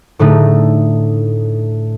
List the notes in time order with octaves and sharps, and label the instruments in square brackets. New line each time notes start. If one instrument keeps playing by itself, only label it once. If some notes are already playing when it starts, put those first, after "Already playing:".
[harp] A2 D3 A3 D#4